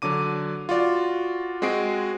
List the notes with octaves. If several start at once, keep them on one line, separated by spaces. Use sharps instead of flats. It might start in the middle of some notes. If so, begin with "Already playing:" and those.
D3 F#3 D4 D6 D#7
F4 F#4 D5
G#3 C4 F#4 G#4 C7 D7